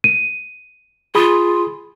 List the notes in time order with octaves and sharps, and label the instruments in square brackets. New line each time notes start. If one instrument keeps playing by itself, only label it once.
[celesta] D#7
[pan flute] F4 [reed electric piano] G#4 B5 D#6